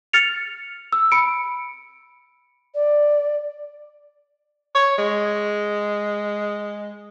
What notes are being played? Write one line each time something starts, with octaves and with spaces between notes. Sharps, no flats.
F6 A6 C#7 F7
E6
B5 C#7 D7
D5
C#5
G#3